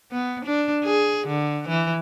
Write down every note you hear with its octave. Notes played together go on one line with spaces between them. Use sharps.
B3
D4
G#4
D3
E3